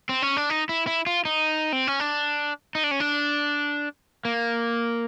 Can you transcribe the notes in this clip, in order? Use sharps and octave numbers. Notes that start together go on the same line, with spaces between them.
C4
C#4
D4
D#4
E4
E4
F4
D#4
C4
C#4
D4
D#4
D4
C#4
D4
A#3